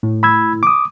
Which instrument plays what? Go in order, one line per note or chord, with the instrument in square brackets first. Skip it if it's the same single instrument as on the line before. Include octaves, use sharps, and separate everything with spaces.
[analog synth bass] A2
[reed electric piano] B5 E6 G#6
D6 D#6